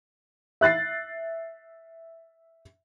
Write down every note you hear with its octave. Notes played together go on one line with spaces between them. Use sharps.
E5 F#6 A6 C7